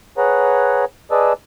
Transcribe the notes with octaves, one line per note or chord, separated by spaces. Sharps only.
G#4 B4 C#5 F#5 A#5
G#4 B4 D5 D#5 A5 E6